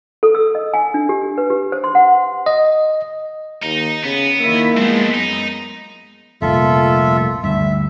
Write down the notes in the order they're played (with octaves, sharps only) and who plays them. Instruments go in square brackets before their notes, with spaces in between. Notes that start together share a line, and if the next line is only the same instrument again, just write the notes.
[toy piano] A4
E6
D#5
G#5
D4
G4
B4
G4
C5
C6
F#5
[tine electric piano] D#5
[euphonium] D#2 [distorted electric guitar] D#4
[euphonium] C#3 [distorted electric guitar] B3
[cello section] D#3 E4 E5 [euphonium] A#3
[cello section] F3 G#3 B3 [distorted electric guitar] A3 C4
[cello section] F#2 [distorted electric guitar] D#4
[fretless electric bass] F1 C2 A#2 [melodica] F4 A4 E5
[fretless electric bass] D2 G2 [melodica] E5